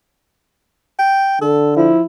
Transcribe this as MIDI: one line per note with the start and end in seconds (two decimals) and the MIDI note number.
0.99 1.40 79
1.41 1.90 50
1.41 1.74 69
1.77 2.04 53
1.77 2.02 64